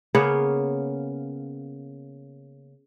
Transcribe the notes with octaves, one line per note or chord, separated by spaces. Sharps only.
C#3 A#3 B3 C#5